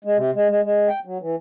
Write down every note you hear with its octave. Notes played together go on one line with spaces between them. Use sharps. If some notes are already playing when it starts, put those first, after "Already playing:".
G#3
C3
G#3
G#3
G#3
G5
F#3
E3